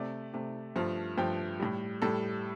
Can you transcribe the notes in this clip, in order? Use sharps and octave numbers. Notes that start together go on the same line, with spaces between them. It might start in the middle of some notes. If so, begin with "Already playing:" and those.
Already playing: C3 A3 D5
C3 A3
G2 F3 A3
G2 F3 A3 G5
A2 G3
A2 G3 A4